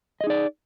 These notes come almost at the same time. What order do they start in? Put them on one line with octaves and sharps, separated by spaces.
D#5 G#4 D#4 D5